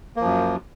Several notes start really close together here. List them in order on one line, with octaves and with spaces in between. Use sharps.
A#3 F3 F#2